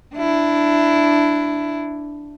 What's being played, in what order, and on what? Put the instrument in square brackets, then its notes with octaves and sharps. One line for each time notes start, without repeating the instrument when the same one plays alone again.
[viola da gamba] D4 E4